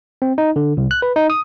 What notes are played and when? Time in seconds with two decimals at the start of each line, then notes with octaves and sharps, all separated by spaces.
0.22 C4
0.38 D#4
0.56 D3
0.77 C2
0.91 F#6
1.02 B4
1.16 D#4
1.30 D#6